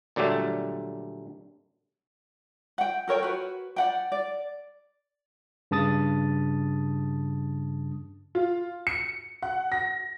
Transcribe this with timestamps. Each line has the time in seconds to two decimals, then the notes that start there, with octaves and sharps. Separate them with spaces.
0.16 A#2 D3 F#3 G3 A3
2.78 F#5 G5
3.08 A4 A#4 C#5 G5
3.22 F#4 B4
3.76 D5 F#5 G5
4.12 D5
5.71 G2 C#3 A5 D#6 A6
8.35 F4
8.87 C#7
9.42 F#5
9.72 A#6